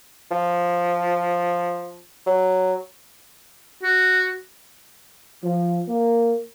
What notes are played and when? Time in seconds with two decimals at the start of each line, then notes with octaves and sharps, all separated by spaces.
0.31 F3
2.27 F#3
3.83 F#4
5.43 F3
5.87 A#3